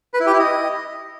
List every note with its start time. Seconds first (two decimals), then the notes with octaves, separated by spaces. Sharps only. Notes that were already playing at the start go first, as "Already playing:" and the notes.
0.14 B4
0.20 E4
0.27 G4
0.33 E4
0.39 D#5